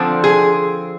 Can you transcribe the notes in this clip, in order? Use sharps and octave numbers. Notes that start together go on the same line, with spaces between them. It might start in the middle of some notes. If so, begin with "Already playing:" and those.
Already playing: D3 F3 C4
G#4